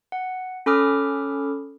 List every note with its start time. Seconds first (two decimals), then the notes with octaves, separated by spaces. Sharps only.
0.12 F#5
0.66 C#4 A4 B5 D6 D#6 F6